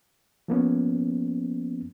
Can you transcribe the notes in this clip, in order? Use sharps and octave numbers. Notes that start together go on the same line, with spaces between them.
F3 A#3 B3 C#4